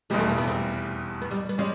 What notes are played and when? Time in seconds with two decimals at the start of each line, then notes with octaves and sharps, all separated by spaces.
0.10 F1 E2 B2 G3 G#3
0.19 A3
0.29 A#3
0.38 B3
0.47 C4
1.22 B3
1.31 G3
1.49 B3
1.58 G3 G#3 C#4